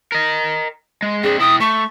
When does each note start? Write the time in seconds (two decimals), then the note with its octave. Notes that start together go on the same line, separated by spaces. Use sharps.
0.12 A#4 D#5
1.02 G#3
1.23 C4 D4 G#4
1.40 E4 G5 D#6
1.60 A3 C#6